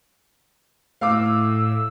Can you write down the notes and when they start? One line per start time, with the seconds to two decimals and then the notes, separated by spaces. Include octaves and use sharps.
1.01 A2 F5 D6 E6